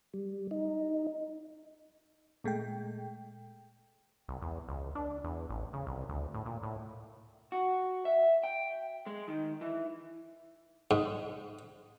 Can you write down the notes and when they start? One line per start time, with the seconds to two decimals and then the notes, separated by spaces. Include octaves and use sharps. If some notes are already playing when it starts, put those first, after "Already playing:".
0.14 G3
0.51 D#4
2.44 A#2 G#3 A3 G5
4.28 C2
4.42 E2
4.69 C#2
4.95 D4
5.24 E2
5.49 A1
5.73 C#3
5.87 C2
6.09 D2
6.34 A2
6.46 A#2
6.63 A2
7.52 F#4
8.05 E5
8.44 G5
9.06 G#3
9.28 D#3
9.61 E3
10.91 G#2